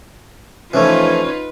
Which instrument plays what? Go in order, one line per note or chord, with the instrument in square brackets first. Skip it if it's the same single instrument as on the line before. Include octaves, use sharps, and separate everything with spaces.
[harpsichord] E3 F3 A3 [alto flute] C#4 [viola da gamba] D#4 F4 B4